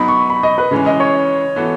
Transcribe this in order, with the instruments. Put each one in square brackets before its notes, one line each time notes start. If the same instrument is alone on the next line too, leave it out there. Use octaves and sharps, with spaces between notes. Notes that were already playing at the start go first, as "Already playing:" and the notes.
Already playing: [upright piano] F#3 B3 D#4 [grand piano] B5
[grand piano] C#6
B5
D#5
B4
[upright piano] C#3 E3 G#3 C#4
[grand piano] D#5
C#5
[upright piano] E3 B3 F#4 A4